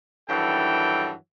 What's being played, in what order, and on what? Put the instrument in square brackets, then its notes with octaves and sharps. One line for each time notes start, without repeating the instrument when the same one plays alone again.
[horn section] G2 D#3 E3 F#3 A4 G5